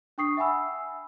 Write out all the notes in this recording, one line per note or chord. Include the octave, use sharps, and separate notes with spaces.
D4 G5 C#6 D#6 C7
E5 F#5 G#5 B5 E6